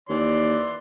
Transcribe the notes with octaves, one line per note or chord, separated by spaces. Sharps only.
D#2 E3 D5 C6